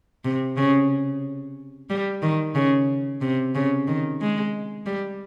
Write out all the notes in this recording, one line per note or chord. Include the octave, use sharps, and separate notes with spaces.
C3
C#3
G3
D#3
C#3
C3
C#3
D#3
G#3
G3